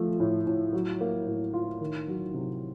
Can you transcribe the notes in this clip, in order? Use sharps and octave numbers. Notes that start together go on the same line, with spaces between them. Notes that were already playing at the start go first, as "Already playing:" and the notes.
Already playing: F3 A3
A2
A2
F#3
A#3
A2
F4
D#3
F#3
C3